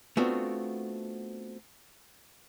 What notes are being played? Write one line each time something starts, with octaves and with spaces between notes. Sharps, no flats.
A3 B3 C4 D4 F4 F#4